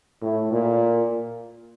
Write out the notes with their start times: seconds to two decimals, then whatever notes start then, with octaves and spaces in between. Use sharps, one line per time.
0.22 A2
0.51 A#2